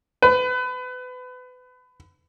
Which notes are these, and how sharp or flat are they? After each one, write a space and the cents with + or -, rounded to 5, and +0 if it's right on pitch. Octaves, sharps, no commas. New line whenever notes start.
B4 +30